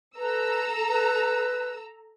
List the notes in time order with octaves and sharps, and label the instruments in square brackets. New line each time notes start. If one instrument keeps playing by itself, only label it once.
[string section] A4 A#5 E6 [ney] B4
[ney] B4